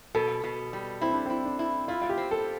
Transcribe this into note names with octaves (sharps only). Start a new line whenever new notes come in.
B2 A4
B2
G3
C4 E4
D4
C4 E4
D4
E4
E4 F4
F4
G4
C4
A4